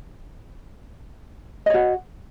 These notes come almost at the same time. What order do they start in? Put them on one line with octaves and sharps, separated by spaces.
D#5 C#5 F#4